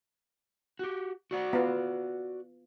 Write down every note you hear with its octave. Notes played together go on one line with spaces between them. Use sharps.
F#4 G4
F#4 D5 F#5
B3 F4